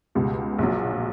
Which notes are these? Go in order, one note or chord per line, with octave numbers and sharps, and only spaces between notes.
C#2 B2 G3
A#1 A#2 F#3